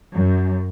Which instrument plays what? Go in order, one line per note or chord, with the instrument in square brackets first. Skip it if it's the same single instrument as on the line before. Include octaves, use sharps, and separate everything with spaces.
[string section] F#2